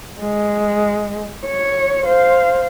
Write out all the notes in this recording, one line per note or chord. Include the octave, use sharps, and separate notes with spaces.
G#3
C#5
C5 F5